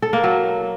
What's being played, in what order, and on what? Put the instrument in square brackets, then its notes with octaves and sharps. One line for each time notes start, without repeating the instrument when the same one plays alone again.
[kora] A4
A#3
F#3